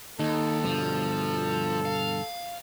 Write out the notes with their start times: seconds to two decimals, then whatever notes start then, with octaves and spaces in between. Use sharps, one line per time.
0.19 D#2 D#4 A4
0.63 G2 B2 D3 F3
1.85 F5